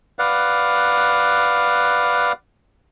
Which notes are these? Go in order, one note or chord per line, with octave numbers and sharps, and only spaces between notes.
B4 D5 F5 F#5